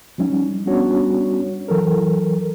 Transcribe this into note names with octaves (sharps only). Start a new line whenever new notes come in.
F3 G3 C#4 D#4
G3 B3 C#4 D4 F#4 C#5
E3 F#3 A4 A#4